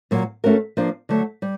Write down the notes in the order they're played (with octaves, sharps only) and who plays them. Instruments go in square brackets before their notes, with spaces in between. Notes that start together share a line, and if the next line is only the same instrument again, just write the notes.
[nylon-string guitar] A#2 F#3 A#3
A3 C#4 F#4 A#4
F3 A#3 D4
D3 F#3 A3
G3